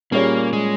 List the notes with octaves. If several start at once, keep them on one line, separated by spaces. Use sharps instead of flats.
A#2 G3 A#3 C#4 G#4 C#5
G#3